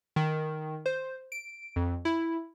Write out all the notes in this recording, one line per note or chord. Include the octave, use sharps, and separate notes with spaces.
D#3
C5
D7
F2
E4